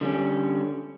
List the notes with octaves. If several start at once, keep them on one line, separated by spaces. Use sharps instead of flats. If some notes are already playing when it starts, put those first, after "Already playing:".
D3 G3 C#4